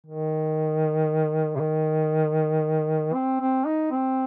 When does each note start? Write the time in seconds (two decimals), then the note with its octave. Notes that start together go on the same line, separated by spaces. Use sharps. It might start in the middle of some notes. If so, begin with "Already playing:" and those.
0.06 D#3
1.56 C3
1.60 D#3
3.14 C4
3.40 C4
3.65 D#4
3.91 C4